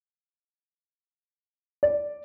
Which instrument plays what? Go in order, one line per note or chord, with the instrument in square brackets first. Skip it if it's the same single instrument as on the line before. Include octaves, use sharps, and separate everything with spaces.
[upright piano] D5